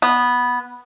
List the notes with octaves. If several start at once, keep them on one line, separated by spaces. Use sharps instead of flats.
B3